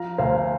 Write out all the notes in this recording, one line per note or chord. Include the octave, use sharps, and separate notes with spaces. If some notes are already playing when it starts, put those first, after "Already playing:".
Already playing: F3 F5 A#5
D2 C5 F5